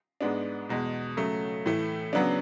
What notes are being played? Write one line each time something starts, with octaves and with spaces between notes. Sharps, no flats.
G#2 G#3 B3 D4
E2 B2 G#3
C#3 F#3 A3
A2 E3 A3
C#3 F#3 B3 D4